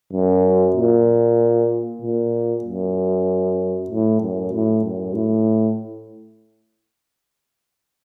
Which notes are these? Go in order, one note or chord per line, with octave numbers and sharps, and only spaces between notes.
F#2
A#2
A#2
F#2
A2
F#2
A2
F#2
A2